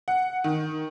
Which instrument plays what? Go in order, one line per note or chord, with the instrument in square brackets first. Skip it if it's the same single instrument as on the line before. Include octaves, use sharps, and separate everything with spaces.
[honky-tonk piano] F#5
D#3